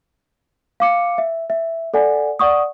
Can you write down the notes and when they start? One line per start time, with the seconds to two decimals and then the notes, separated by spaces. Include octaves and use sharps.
0.80 F5 D6 C#7
1.18 E5
1.50 E5
1.94 A4 D5 F#5 G#5
2.39 D5 F#5 C#6 D#6